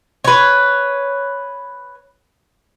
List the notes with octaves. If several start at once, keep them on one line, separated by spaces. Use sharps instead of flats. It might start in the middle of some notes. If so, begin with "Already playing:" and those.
B4 C#5